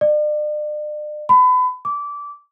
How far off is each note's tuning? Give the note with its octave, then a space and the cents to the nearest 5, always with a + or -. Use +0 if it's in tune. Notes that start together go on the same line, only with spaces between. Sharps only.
D5 +40
B5 +30
D6 -20